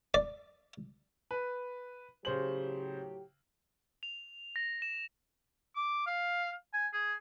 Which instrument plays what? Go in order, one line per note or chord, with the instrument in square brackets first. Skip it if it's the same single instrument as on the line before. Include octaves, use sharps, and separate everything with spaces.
[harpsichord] D5
[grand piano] B4
[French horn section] A2 F#3 G4 [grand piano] C#3 C5 F#7
[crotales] F7
A#6
E7
[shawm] D6
F5
G#5
G#4